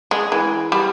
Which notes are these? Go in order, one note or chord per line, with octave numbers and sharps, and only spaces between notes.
G#3
E3
G3